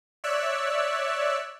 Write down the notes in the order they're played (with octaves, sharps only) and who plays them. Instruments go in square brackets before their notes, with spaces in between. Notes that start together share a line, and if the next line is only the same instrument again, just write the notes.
[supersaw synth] C#5 D5 E5 E6 F#6